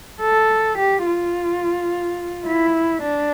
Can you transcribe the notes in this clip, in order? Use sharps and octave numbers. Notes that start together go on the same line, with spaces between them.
A4
G4
F4
E4
D4